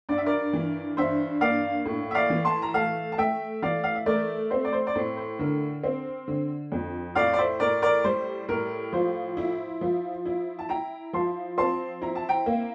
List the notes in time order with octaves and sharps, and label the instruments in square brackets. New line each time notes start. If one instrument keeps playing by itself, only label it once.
[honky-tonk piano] G2 [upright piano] D5
[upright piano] E5
A#4 D5
[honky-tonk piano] E3
[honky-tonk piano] G2 [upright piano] C5 E5
[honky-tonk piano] A#3 [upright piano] D5 F5
[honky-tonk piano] A2
[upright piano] E5
D5 F5
[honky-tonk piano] E3
[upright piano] A5 C6
A#5
[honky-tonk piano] A3 [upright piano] F5 A5
[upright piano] A5
[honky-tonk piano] A3 [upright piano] E5 G5
[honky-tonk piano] E3 [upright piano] D5 F5
[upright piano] F5
E5
[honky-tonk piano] A3 [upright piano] A#4 D5
[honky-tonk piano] C4 [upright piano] C5
[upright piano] D5
C5
D5
[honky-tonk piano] A2 [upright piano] C5
[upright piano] C5
[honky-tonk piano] D3 [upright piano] A#4
[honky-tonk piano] C4
D3
F2
[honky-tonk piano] A2 [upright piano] D5 F5
[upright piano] D5
C5 E5
[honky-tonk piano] A2 [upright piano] A#4 D5
[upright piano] A#4 D5
[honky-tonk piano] G3 [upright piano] C5
[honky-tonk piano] A2 [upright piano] A#4
[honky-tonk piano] F3 [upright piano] C5
[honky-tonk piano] E4
F3
E4
[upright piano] A5
[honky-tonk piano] E4 [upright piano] G5 A#5
[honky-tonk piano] F3 [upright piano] A5 C6
[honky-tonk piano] C4 [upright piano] A5 C6
[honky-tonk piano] E4 [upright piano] A#5
[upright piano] A5
G5 A#5
[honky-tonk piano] A#3